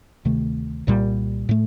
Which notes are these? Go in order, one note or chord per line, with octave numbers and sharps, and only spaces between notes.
D2 C3 D#3 A3
C2 A#2 G3
A2 A3